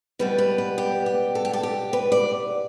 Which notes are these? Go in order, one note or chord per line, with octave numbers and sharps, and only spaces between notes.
B2 G3 B3 B4
B4
B4
G4
G4
A4
G4
A4
G4
B4
D5